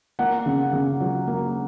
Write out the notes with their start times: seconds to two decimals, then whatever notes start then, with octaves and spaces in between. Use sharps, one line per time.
0.19 A#3 F#5
0.46 C#3
0.73 C#3
1.01 F#3
1.27 A#3